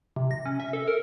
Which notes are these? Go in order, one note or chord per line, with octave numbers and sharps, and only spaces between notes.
C3
A#6
C#4
E5
A4
A#4